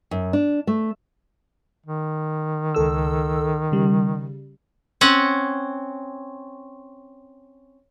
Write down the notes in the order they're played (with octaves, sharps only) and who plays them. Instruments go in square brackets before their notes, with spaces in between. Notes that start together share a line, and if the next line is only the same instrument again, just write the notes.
[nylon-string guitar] F#2
D4
A3
[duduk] D#3
[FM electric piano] C#2 A4 E6
C#3 G3
[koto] C4 C#4 F#5